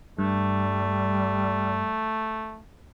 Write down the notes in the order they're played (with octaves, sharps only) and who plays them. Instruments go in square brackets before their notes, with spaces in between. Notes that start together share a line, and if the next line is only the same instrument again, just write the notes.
[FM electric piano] G2 [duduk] G3 [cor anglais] A3